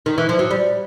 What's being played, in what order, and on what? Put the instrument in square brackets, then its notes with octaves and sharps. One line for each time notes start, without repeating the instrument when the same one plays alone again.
[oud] D#3
E3
F3
F#3
G3